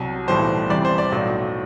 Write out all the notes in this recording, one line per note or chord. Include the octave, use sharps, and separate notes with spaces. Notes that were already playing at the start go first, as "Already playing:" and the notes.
Already playing: C2 C3 F#3
B1 A2 E3 G3 C5
E2 C3 E3 G3 D5
C5
D5
B1 A2 F#3